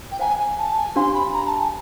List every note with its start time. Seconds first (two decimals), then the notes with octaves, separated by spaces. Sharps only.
0.11 G5
0.19 C5 F5 G#5 A#5
0.39 G#5
0.58 A5
0.77 G#5
0.96 D4 G4 C5 F5 C6
1.14 B5
1.33 A#5
1.46 A5
1.59 G#5